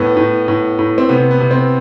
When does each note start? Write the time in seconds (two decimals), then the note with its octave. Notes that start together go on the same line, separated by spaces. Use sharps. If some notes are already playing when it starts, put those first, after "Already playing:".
Already playing: A2 B3
0.17 A2
0.48 A2
0.79 A2
0.98 C4
1.09 C3 B3
1.31 B3
1.40 C3
1.51 C4